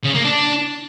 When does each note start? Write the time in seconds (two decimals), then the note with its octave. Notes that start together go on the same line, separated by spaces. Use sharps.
0.04 C#3
0.14 A#3
0.24 D4